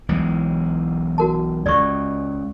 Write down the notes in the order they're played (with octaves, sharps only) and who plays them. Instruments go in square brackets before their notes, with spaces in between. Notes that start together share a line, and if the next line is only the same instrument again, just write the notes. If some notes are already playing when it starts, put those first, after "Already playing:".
[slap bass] B1 E3 G#3
[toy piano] F#4 A#4 A5
[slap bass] C#2 [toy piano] D5 C#6